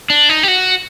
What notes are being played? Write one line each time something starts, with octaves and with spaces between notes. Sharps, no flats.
D4
D#4
G4
F#4